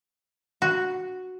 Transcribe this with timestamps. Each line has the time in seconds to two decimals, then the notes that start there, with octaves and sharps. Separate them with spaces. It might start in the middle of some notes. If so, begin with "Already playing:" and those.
0.62 F#4